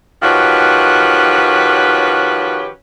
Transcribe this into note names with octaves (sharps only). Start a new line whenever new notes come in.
D#3 F3 C#4 F#4 G4 B4